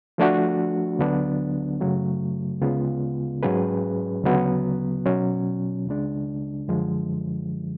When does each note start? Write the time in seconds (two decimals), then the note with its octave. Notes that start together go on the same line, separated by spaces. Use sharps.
0.18 F3 A3 D4 F#4
0.99 D2 D3 F#3 B3 D4
1.80 F#2 C#3 F#3 A3
2.61 D2 C#3 G#3 B3 F4
3.43 G#2 F#3 C#4 G#4 B4
4.24 D2 C#3 F#3 B3
5.06 B2 F#3 C#4
5.87 C#2 C#3 G#3 D4
6.68 F#2 D3 F3 G#3